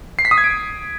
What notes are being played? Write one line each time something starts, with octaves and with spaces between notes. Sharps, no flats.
C7
B6
D#6
G#6
D7